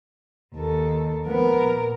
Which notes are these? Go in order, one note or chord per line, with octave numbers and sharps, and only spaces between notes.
D#2 A4
F3 B3 A#4
A#2